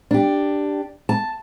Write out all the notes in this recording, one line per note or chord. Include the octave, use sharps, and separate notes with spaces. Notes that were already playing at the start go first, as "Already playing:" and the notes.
D4 G4
A5